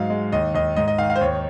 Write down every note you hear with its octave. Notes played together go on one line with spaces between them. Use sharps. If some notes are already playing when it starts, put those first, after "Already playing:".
Already playing: G#2 F#3 F5
G#3
D#2 D#5
D#2 D#5
G#2 D#5
D#5
D#3 F5
F5
C5
D#2 C#5